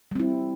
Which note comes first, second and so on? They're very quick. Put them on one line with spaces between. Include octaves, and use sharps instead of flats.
G3 C4 E4